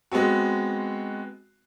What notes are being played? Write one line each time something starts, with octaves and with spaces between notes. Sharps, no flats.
G#3 B3 C4 F#4